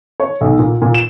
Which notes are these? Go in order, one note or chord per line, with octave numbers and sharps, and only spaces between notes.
C#5
B1
A#2
A#2
E7